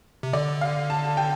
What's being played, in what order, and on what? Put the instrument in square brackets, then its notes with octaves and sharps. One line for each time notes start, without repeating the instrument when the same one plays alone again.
[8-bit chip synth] C3
[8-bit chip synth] D3 [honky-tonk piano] D5
[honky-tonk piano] F5
A5
G5